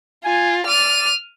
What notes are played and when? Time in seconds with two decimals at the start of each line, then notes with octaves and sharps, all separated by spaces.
0.25 F4 G#5
0.67 D5 F6 D#7